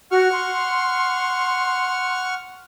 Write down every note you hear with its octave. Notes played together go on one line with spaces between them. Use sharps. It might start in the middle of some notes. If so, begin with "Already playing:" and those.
F#4 F#5 C#6 F6
C6